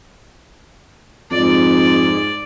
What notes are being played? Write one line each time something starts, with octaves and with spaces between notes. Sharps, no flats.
F2 G#2 D5